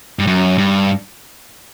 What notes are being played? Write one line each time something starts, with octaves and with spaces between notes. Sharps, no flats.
G2
F#2
G2